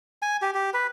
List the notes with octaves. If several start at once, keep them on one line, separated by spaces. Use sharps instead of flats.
G#5
G4
G4
B4